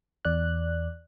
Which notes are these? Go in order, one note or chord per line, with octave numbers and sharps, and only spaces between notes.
E2 D5 F#6